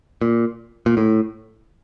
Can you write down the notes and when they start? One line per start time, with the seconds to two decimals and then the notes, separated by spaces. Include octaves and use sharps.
0.21 A#2
0.86 A#2
0.97 A2